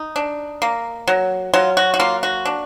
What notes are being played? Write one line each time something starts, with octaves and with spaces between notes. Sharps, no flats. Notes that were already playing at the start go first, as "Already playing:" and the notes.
Already playing: D#4
D4
A#3
F#3
F#3 F4
F#4
F#4
A#3 F4
F#4
D4